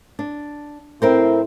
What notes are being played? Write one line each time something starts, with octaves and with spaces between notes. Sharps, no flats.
D4
A2 C4 E4 A#4 C5